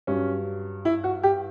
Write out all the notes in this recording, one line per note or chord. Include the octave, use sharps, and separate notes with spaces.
G2 F#3 C#4
E4
F#4
G4